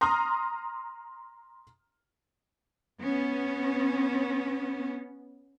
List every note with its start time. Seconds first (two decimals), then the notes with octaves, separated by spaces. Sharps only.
0.01 A#5 C6 D#6 F6
2.99 B3 C#4